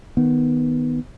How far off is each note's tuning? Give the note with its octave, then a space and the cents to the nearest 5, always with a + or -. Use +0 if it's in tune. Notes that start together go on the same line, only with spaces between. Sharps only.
D#3 +0 B3 +0